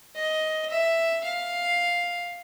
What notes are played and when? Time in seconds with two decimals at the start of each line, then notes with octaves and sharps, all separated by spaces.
0.15 D#5
0.70 E5
1.24 F5